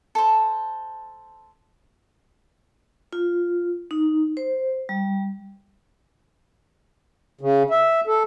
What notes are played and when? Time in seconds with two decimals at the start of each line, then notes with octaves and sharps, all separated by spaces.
0.15 A4 C5
3.13 F4
3.91 D#4
4.37 C5
4.89 G3
7.41 C#3
7.71 E5
8.07 A4